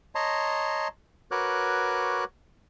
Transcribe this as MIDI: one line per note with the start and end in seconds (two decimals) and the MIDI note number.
0.15 0.88 73
0.15 0.88 75
0.15 0.88 81
0.15 0.88 82
0.15 0.88 84
1.31 2.24 66
1.31 2.24 70
1.31 2.24 71
1.31 2.24 73
1.31 2.24 86
1.31 2.24 90